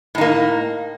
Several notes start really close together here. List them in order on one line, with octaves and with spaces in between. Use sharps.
A2 D#4 A#3